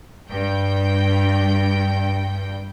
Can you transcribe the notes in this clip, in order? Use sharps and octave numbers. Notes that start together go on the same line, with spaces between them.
G2 G5